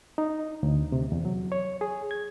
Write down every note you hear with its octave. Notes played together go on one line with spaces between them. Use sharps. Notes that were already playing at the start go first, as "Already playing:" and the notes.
D#4
D2
C3
E2
F#3
C#5
G#4
G#6